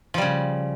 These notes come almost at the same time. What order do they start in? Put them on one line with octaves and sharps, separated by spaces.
F3 G3 C#3